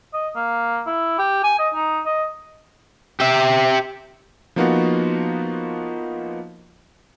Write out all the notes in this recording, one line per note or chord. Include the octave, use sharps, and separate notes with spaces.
D#5
A#3
E4
G4
G#5
D#5
D#4
D#5
G4 E5
F3 A#3 B3 D#4 F4 F#4